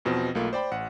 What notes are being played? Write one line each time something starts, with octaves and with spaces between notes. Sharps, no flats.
E2 B2 F3 C4
B1 A3 A#3 F4
C5 D5 G5 B5
A1 F#5